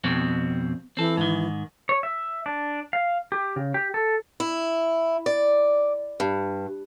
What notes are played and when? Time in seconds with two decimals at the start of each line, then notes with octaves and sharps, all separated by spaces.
0.04 F2 B2 C4
0.97 E3 C4 A4
1.17 G#2 D#3
1.89 C#5
2.03 E5
2.46 D4
2.93 F5
3.32 G4
3.56 C#3
3.74 G4
3.94 A4
4.40 E4
5.26 D5
6.20 G2